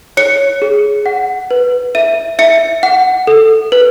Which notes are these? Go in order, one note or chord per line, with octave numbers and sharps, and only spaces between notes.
C#5 C#7
G#4
F#5
B4
E5 D#7
E5 C#7
F#5
A4
B4